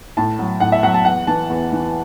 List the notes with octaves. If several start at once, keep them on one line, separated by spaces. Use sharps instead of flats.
A2 A5
F#3
A2 F#5
E5
F#3 F#5
A5
E2 F#5
E3 A5
E2
E3